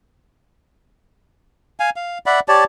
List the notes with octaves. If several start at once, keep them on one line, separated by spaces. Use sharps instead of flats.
F5 G#5
F5
D5 E5 F#5 B5
G4 C#5 D5 A5